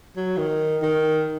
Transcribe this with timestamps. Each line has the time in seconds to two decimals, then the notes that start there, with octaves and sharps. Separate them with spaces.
0.17 F#3
0.37 D#3
0.83 D#3